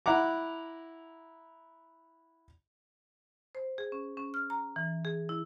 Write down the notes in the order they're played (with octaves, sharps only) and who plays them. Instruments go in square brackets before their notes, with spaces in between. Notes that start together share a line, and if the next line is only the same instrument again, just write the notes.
[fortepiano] E4 F#5 A#5 D6
[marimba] C5
G#4
C#4
C#4
F6
A#5
E3
G#4
E4